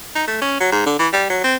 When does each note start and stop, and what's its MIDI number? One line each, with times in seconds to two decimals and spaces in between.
0.15 0.24 63
0.27 0.38 57
0.42 0.60 61
0.60 0.71 54
0.72 0.82 44
0.86 0.95 50
0.99 1.08 52
1.13 1.27 55
1.30 1.43 54
1.44 1.56 60